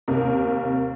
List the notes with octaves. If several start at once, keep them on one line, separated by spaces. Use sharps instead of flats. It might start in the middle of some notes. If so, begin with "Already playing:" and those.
D#2 C3 A#4